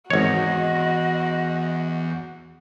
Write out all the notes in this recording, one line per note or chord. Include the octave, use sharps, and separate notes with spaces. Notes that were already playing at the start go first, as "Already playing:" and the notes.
G#1 E2 F#4 C#5 D#5